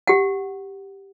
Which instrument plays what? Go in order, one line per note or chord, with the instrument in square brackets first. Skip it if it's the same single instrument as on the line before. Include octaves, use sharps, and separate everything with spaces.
[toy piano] G4 F#5